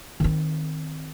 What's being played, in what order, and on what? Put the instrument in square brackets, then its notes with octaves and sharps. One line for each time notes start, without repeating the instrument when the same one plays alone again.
[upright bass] D#3 C4